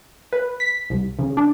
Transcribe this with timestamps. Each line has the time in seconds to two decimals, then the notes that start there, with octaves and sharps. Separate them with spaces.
0.33 B4
0.60 B6
0.90 C2
1.19 C#3
1.37 D4